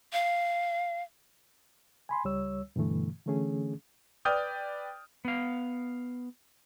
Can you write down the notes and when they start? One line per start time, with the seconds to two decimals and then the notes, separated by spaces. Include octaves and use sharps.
0.13 F5
2.09 G#5 B5 C6
2.25 C#2 G3 C#5 E6
2.76 G2 B2 D3 E3 A3
3.26 D3 E3 A3 C#4 G#4
4.25 B4 D5 G5 D#6 F6 G6
5.25 B3 F5